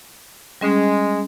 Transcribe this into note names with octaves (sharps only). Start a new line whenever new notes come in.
G3 G#3 C#4